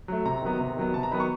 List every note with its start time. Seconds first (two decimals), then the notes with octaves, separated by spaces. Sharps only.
0.08 F#3 A3
0.25 C3 A#5
0.42 D#3 F#3 B3
0.59 C3
0.77 D#3 F#3 B3
0.94 C3 A5
1.03 A#5
1.11 D#3 F#3 B3 B5
1.20 C#6